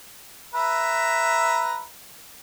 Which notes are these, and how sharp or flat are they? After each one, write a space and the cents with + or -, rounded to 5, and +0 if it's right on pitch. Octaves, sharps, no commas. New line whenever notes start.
B4 +0 E5 +5 A#5 +0